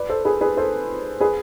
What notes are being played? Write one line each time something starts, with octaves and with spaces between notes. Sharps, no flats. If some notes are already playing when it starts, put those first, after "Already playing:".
Already playing: B4 D5
A4 C5
G#4 B4
G#4 B4
A4 C5
G#4 B4